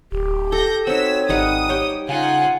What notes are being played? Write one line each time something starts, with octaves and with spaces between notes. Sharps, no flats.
D1 G4
A4 G6 A#6
C4 D#4 F#4 C#5 E6 B6
G#1 G3 D#4 F#5 D#6
G4 C#5 G5
C#3 D#4 F4 F#5 G#5